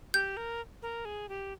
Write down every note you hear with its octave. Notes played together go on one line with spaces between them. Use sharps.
G4 G6
A#4
A#4
G#4
G4